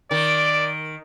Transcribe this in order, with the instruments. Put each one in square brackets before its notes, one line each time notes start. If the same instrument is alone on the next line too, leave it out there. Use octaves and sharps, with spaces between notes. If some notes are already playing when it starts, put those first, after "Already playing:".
[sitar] D#3 [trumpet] D5